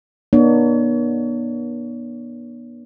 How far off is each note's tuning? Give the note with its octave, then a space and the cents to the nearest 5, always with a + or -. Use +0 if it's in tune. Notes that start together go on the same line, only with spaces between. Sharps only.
B3 -45 D4 +40 C#5 +35